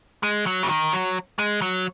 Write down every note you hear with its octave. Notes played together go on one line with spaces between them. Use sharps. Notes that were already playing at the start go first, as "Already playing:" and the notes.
G#3
F#3
C#3
D#3
F#3
G#3
F#3